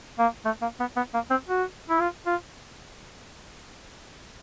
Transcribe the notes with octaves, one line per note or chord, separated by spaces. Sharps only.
A#3
A3
A#3
B3
B3
A#3
C4
F#4
E4
F4
F4